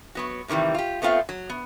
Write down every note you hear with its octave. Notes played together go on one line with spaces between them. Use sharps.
F#3 B3 F#4
A2 C3 D#3 E3 G3
F4 G4
A3 B3 C4 F4 F5
F#3
B3